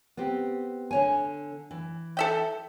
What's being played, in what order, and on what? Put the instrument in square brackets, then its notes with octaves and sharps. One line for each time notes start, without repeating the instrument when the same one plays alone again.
[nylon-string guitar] B3 C4 G4
D3 C#5 G#5
E3
[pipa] A4 E5 G5